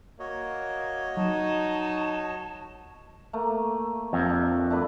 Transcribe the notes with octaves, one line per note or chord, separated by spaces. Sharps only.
A#3 F#4 C#5 D#5
F#3 D#4 A5
A3 A#3
F2
D4
A3 D4 B4